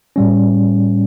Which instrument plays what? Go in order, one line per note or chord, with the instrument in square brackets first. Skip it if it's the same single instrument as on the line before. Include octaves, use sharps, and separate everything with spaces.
[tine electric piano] A2 G3 C#4